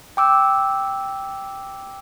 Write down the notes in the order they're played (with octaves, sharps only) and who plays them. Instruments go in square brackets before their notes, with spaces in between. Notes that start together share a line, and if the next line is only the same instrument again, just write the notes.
[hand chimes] G5 D6 E6